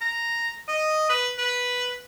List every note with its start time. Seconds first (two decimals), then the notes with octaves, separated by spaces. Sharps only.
0.01 A#5
0.68 D#5
1.09 B4
1.38 B4